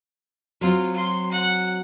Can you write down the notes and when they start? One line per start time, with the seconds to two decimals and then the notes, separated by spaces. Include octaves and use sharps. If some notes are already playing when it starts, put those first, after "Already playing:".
0.61 F#3 C4 F4
0.95 C6
1.32 F#5